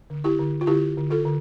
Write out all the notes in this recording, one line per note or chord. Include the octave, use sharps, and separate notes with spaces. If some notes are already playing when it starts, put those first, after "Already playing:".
D3
E4 G4
D3
F4
D3 E4 G4
D3
F4 A4
D3